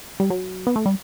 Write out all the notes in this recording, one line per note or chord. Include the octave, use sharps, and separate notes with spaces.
G3
F#3
B3
A3
G3